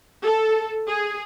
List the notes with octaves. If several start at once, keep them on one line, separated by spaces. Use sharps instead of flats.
A4
G#4